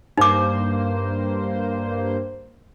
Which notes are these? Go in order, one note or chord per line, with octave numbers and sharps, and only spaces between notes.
G2 A#3 D#4 C5 D6